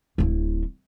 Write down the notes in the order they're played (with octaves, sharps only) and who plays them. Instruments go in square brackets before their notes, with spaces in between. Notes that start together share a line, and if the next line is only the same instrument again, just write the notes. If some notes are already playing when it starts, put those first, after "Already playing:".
[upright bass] D1 E4